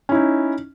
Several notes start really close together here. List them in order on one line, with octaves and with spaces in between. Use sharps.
C#4 E4 D#4